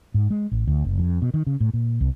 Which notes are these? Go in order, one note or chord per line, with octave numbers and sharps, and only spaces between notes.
G#2
G#3
A1
D2
F#1
F2
B2
D#3
C#3
A2
A#2
C2